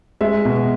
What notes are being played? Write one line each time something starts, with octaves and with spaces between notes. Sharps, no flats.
G#3 E5
B2